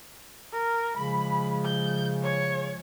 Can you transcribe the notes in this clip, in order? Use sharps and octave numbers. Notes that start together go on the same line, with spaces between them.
A#4
C#3 F3 G#3 B5
G6
C#5